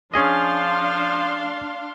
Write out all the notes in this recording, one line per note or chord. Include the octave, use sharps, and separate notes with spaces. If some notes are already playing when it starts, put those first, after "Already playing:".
F3 C#4 D4 G#4 D#5 F5 C6